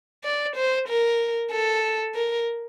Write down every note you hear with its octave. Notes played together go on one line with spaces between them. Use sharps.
D5
C5
A#4
A4
A#4